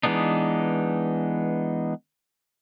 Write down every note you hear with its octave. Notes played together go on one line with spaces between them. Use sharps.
E3 G#3 B3 D4 D#4